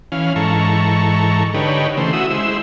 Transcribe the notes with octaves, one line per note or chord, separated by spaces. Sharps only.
E3 C#4 F5
G#2 E3 A4 A#5 C#6
D3 D#4 G4 B4 C#5
C#3 E3 A3 C5
E4 F#4 D#6 E6
G#3 E4 C5 E6